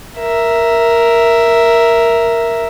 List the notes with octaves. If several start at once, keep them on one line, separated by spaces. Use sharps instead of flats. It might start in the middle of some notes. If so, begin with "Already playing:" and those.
A#4 E5